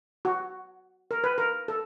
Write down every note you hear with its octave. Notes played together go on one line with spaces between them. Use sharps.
F#4
A#4
B4
A#4
A4